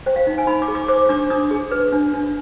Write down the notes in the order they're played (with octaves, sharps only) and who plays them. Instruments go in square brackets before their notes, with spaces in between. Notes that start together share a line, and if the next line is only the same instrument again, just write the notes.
[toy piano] C5 G5
F5
D#4
G#5
D#4 B5
D6
G#4
D6
C5 D6
D4 D6
D4 D#6
G#4
B4
D4
D4